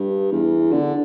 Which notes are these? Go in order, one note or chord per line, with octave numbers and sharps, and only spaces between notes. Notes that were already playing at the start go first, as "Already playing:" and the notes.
Already playing: G2
E2
D3